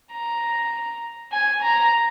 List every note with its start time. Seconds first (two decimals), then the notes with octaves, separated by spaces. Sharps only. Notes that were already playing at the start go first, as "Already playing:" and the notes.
0.12 A#5
1.32 G#5
1.63 A#5